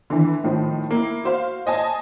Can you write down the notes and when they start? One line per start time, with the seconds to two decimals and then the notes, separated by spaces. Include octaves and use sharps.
0.10 D3 E3
0.44 A2 D#3 F3
0.91 A#3 E4
1.24 F#4 C5 F5
1.66 C5 D#5 G#5 A5 D#6